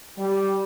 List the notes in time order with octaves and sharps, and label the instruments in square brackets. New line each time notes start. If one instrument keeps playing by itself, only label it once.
[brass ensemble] G3